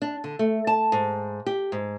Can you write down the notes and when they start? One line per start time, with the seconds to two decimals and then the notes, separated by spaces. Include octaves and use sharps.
0.02 D4
0.24 D3
0.39 A3
0.67 A5
0.92 G#2
1.46 G4
1.72 G#2